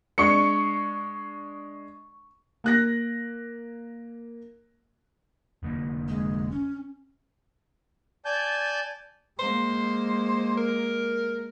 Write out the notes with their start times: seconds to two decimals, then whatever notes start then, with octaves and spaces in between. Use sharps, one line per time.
0.18 G#3 D4 C#6 C#7
2.64 A#3 F#6 A#6
5.63 F1 D3 A#3
6.08 G#3
6.51 C#4
8.25 D5 G#5 A5 G6
9.39 G#3 A#3 C5
10.57 A#4